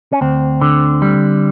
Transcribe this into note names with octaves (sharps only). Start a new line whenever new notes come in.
C#4
D2 C4
D3
G3